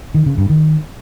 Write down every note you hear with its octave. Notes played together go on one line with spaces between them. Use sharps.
D#3
C#3
G2
D#3